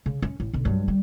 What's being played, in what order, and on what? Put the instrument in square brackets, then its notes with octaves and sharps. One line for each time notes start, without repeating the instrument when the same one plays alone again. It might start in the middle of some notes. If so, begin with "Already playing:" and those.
[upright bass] C#3
C#4
A1
B1 D3
G2 F#3
G3